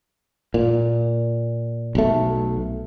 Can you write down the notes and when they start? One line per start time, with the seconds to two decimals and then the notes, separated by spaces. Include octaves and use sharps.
0.54 A#2
1.95 B1 A3